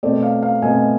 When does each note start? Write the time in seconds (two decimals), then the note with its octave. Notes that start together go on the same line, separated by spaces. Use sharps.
0.03 B2 A3 C4 D5
0.23 F5
0.43 F5
0.62 B2 A3 C4 G#5